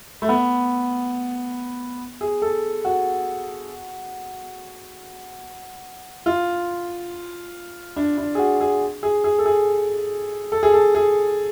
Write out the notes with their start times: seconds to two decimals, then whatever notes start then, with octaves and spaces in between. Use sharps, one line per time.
0.22 A3
0.29 B3
2.21 G#4
2.42 A4
2.85 F#4
6.26 F4
7.96 D4
8.18 D4
8.35 G#4
8.39 F#4
8.60 G#4
9.03 G#4
9.24 G#4
9.38 A4
9.46 G#4
10.52 A4
10.63 G#4
10.74 A4
10.95 G#4